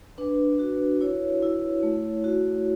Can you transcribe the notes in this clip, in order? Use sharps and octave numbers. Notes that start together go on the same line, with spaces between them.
D4 B4
F#4
E4 C#5
E4
A3
F#4